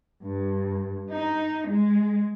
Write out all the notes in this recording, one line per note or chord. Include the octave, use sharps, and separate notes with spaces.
G2
D#4
G#3